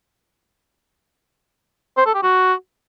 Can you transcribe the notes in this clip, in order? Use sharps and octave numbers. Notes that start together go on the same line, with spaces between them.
C5
A4
G4
F#4